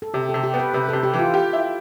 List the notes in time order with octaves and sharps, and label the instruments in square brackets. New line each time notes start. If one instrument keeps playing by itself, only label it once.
[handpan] A4
[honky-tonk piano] C3 [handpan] G4
[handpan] A4
[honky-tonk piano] C3
[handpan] G4
[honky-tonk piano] B3
[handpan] B4
[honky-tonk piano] C3 [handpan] B4
[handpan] A4
[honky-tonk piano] C3
[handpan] G4
[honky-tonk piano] E3
[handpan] F4
[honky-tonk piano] G4
E4